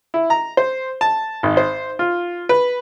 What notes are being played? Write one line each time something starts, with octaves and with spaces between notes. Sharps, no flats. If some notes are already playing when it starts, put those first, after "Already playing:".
E4
A#5
C5
A5
G#1
C5
F4
B4